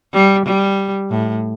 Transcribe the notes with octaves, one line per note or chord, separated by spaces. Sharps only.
G3
G3
A2